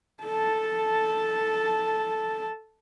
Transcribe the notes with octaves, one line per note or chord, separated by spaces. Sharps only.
A4 A5